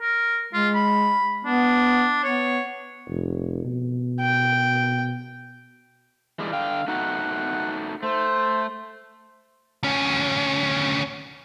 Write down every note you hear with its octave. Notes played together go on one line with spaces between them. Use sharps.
A#4
G#3 F4
B5
B3 D4
B3 C#5
F1
B2
G5
E3 G3 G#3
D3 F5 G5
A3 D#4 F#4 F#5
A3 C5
D2 C#4